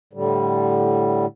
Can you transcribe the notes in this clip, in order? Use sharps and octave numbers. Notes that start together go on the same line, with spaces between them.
A2 D3 G3